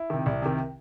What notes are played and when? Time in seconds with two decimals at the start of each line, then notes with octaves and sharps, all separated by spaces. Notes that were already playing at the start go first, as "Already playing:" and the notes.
Already playing: E4
0.10 C3 D#3
0.26 C2
0.42 C3 D#3